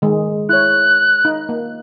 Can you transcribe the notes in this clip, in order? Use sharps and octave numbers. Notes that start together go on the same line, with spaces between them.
D#3 G#3
E4 C#5 F#6
D#4
A#3